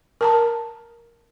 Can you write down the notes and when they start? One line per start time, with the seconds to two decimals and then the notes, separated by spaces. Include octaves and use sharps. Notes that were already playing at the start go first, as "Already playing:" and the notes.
0.21 A#4 A5 A#5